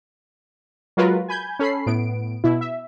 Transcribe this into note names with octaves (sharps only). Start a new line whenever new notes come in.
F#3 G#3 F4 F#4 A#4 B4
G#5 B5 G6 G#6
C#4 A4 B5 C7
A2 B3 D7
B2 E4
E5